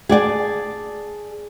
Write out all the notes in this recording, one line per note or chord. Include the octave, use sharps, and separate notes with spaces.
G#4 D5 G5 A5